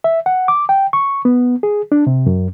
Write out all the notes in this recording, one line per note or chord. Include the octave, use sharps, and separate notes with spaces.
E5
F#5
D6
G5
C#6
B3
G#4
D4
C3
F#2